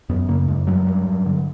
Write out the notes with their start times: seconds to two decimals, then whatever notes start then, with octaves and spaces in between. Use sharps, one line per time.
0.09 F#2 B3
0.28 C#3 A#3
0.48 F#2 G#3
0.67 G2 F#3
0.87 G2
1.06 G2
1.26 D3